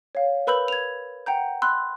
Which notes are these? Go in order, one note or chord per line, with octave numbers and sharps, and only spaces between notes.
C#5 F5
A#4 B4 B5 E6 G6 F#7
G#6 F7
F#5 G5 A#5 G6
B5 C6 E6 F#6